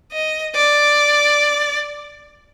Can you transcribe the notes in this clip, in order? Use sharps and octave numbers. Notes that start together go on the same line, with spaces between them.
D#5
D5